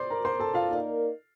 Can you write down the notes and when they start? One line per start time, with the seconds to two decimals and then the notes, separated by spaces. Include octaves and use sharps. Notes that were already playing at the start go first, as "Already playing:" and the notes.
Already playing: C5 D5 C6 D6
0.10 A#4 A#5
0.25 C5 C6
0.40 A4 A5
0.54 F4 F5
0.69 A#3 D#4 A#4 D5